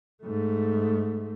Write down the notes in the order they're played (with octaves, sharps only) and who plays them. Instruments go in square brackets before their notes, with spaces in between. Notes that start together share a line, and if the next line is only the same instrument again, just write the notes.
[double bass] G#2 A3